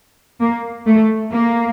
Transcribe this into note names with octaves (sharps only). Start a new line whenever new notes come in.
A#3
A3
A#3